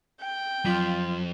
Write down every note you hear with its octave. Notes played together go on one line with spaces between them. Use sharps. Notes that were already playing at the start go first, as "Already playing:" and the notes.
G5
F2 F#3 F4 B6 F#7